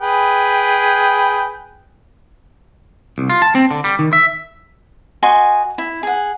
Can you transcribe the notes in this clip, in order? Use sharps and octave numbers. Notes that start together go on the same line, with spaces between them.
G#4 B4 G5
C2
F4
A5
C4
D3
G3
D#3
E5
F#4 D#5 G#5 C6
E4
G#4 F#5